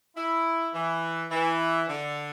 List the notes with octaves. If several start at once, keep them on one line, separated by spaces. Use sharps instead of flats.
E4
E3
E3
D3